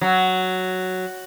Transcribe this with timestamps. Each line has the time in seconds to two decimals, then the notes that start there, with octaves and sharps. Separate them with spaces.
0.01 F#3